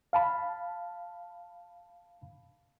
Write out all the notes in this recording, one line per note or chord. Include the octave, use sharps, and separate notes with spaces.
F5 A5 B5